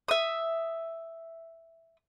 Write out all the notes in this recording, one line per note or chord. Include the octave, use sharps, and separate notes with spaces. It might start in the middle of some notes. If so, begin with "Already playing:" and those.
E5 D#6